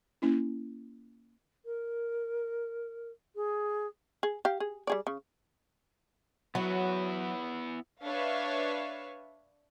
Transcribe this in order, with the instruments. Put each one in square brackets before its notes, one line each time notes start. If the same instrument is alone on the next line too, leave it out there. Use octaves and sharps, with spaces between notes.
[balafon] A#3 C#4 E4
[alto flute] A#4
G#4
[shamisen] G#4
G4 F5
G#4
G3 G#4 D5
C#3
[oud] F#3 [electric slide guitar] B3 E4
[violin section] D4 B4 C#5 E5 F5